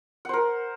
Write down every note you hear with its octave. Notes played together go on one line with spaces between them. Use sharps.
A#4 C5 F#5